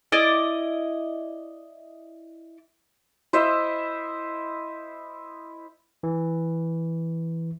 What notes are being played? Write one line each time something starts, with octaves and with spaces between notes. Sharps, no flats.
E4 D5 D#5
E4 C5 D#5 E5
E3